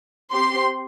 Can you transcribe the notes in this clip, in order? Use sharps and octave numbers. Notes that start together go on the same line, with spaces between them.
C4 G4 C6